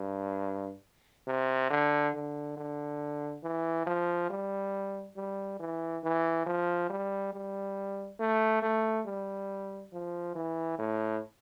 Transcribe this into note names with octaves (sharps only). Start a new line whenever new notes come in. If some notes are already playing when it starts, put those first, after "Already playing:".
Already playing: G2
C3
D3
D3
D3
E3
F3
G3
G3
E3
E3
F3
G3
G3
A3
A3
G3
F3
E3
A2